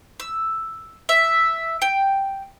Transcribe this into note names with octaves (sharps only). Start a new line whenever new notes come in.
E6
E5
G5